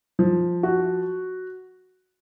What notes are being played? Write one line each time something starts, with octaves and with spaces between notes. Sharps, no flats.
F3
F#4